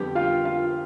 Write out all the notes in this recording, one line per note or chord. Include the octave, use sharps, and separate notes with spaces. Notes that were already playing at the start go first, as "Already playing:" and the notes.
Already playing: F2 D3 G3 B3 G4 G5
F4 F5
F4 F5